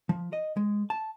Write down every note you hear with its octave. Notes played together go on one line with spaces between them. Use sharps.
F3
D#5
G#3
A5